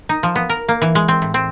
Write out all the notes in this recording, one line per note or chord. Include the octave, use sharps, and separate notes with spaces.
D#4
F3
B3
A#4
A#3
E3
G#3
C4
A2
C4